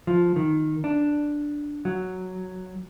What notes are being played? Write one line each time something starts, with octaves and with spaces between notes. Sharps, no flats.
F3
D#3
D4
F#3